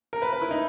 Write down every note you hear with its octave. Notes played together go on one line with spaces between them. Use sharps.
A#4
B4
B4
E4
D#4